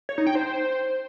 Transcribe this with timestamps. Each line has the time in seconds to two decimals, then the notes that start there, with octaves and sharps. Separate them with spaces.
0.09 C#5
0.18 D#4
0.27 G5
0.35 C5